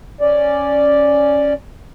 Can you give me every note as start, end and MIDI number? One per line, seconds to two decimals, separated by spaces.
0.21 1.53 61
0.21 1.53 74